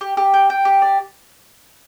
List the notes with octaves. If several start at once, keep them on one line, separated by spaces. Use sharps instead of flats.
G4
G4
G5
G5
G4
D5